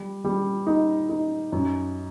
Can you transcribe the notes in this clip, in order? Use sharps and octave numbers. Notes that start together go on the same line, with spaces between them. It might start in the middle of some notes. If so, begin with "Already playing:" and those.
Already playing: G3
G3
D#4
D#4
F#2